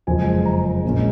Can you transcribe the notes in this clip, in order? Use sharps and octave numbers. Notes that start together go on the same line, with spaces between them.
F#1 F2 F3 G#3 G#5
A#5
A#1 A#2 G#3 C#4